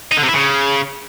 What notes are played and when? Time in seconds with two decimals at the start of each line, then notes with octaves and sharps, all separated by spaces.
0.12 D#4
0.17 D3
0.23 C3
0.28 E4
0.34 C#3